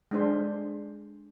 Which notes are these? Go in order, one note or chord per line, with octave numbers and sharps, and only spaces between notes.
G#3 D4 C5